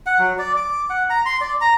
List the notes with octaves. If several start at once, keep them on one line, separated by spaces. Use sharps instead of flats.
F#5
F#3
D5
D6
F#5
A#5
C6
D5
A#5